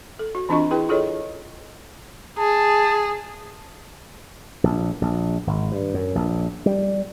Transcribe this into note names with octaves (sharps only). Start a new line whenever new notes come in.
A4
F#4
E3 C4 D4 F4 D#5 C#6
E4 G#4 B4 G5
F4 G#4 A4 C#5 D#5
G#4 A5
A#1
A#1
G#1
G2
F#2
A#1
G3